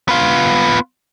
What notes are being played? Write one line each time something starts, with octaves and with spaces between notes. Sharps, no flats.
B3 F4